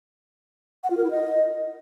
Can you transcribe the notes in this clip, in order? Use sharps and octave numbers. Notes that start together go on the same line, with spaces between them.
F#5
F4
A#4
E4
D#5